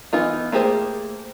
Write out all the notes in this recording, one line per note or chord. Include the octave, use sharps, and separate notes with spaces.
E3 B3 D#4 F4
A3 A#3 G4 G#4 C5